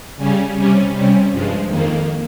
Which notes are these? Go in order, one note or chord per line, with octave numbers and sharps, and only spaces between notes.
C#3 G3 C#4
C3 G3 C#4
C3 G3 C#4
G2 F3 G#3
F2 D#3 A#3